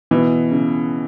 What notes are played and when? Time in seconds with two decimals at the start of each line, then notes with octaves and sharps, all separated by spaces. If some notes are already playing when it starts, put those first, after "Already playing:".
0.11 B2 E3
0.51 C#3